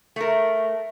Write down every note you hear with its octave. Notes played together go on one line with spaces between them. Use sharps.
A3 A#4